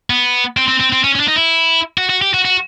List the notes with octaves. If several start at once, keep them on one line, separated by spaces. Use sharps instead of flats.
B3
C4
C4
C4
C4
C#4
C#4
D4
D#4
E4
F#4
F#4
G4
F#4
F#4